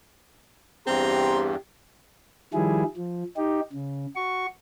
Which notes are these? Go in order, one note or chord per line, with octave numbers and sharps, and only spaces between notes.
E2 G2 C4 G4 A#5 C6
D#3 F3 G3 E4 G#4
F3
D#4 G4
C#3
F#4 C#6